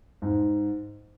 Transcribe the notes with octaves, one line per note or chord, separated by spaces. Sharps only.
G#2